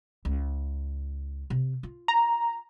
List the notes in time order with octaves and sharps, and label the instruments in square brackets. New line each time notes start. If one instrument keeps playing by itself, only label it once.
[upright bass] C#2
C3
F4
[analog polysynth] A#5